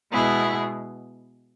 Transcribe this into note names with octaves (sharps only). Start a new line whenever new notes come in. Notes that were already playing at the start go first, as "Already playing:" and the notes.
B2 G#3 B3 E4 G#4